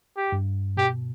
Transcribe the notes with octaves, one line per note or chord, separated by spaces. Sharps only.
G4
G2
B2 G4